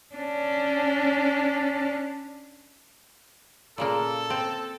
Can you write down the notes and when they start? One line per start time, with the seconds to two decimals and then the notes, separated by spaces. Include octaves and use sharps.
0.15 C#4 D4
3.78 A#2 C#3 A#3 A4
4.30 C4